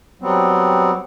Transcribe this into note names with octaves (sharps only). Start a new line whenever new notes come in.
F#3 G3 B3 C4